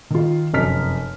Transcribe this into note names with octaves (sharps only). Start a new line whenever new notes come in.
D#3 F4
F1 F#2 F6 B6